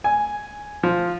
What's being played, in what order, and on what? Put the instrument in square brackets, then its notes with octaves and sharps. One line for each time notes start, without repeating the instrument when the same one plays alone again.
[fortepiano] G#5
F3